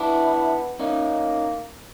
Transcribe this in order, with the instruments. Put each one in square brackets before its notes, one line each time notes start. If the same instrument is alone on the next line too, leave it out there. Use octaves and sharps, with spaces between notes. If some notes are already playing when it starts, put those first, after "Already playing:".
Already playing: [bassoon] B3 [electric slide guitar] D4 E4
[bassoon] A#3 [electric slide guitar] C#4 D#4